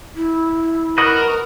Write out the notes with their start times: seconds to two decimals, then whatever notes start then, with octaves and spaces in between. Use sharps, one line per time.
0.15 E4
0.98 F#4 A#4 B4 D#5